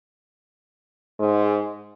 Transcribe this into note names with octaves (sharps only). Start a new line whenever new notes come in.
G#2